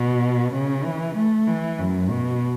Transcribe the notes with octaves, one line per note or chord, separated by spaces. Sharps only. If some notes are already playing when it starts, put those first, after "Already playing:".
Already playing: B2
C#3
E3
A3
E3
F#2
B2